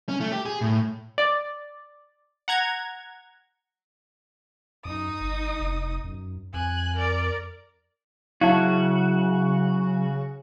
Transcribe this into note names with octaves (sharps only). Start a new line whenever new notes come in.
C#4
A3
G4
G#4
A2
D5
F#5 A#5 G#6
F#2 D#4 D#6
G1
F1
F#2
F2 G#5 F#6
A#4 D5
C#3 F#3 E4 F#4 F5 A5